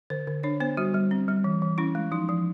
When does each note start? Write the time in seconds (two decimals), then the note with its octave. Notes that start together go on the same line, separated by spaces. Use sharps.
0.10 D3 C5
0.27 D3
0.43 D4 C#5
0.60 B3 C5
0.77 G3 F#4
0.94 G3
1.11 C4
1.28 G3
1.44 E3
1.62 E3
1.78 C#4 E4
1.95 G#3
2.12 F3 D#4
2.29 F3